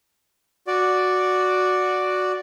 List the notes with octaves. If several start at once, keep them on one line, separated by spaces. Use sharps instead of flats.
F#4 D5